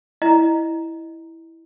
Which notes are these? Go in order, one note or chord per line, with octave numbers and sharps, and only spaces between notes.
E4 D#5 A#5